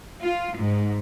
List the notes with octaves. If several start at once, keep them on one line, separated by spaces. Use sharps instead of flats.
F4
G#2